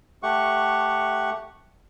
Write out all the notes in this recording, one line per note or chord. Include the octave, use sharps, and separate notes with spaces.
A3 G4 F#5 C#6